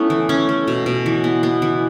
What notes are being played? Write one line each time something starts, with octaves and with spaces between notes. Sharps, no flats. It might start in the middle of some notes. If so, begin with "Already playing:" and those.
Already playing: A3 B3 C#4 E4
E3
A3 C#4
A3
B2
B2
E3
B3
B3
E3